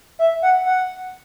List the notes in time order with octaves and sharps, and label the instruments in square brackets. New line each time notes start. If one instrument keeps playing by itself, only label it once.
[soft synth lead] E5
F#5
F#5